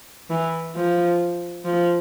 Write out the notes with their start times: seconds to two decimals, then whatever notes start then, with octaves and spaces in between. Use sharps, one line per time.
0.30 E3
0.76 F3
1.65 F3